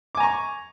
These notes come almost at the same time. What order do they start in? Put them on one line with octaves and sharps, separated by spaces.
D6 G#5 A#5 C#6